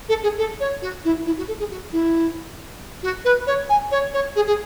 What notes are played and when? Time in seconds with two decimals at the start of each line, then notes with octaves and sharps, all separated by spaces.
0.09 A4
0.23 G#4
0.38 A4
0.60 C#5
0.82 F#4
1.04 E4
1.26 E4
1.38 F#4
1.48 A4
1.59 G#4
1.70 F#4
1.92 E4
3.03 F#4
3.25 B4
3.47 C#5
3.69 G#5
3.91 C#5
4.13 C#5
4.36 G#4
4.47 G#4